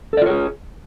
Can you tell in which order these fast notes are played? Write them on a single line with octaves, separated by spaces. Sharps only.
A4 D5 F4 C#5 G#4